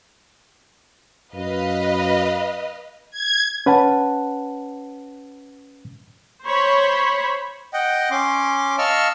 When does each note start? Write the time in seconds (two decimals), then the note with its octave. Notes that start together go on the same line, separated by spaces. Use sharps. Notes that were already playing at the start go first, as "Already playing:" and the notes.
1.34 F#2 B4 D#5 F5
3.11 G#6
3.66 C#4 B4 F#5 A5
6.45 C5 C#5 B5
7.73 D#5 F#5 G5
8.11 C#4 C6 D6
8.78 D#5 F5 A5 C#6 E6 F6